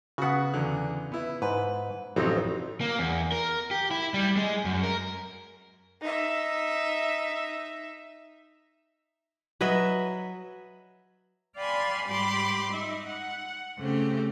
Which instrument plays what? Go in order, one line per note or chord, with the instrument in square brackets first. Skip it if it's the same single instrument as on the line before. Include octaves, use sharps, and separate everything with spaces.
[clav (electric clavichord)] C#3 B3 [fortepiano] F#4 F#5
[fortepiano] E2 D3
B3 E4
[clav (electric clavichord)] G#2 [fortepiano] B4
[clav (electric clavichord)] A1 C4 D#4 [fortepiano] F2 C3 F#3
[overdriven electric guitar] A#3
E2
A#4
G4
E4
G3
G#3
F#2
A#4
[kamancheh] D#4 E5
[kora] F#3 B4 D#5 E5
[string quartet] D5 F5 G5 G#5 B5 C6
G#2 G3 G4 B5 C6 D6
D#4 E5
F#5
C#3 A3 C4 G4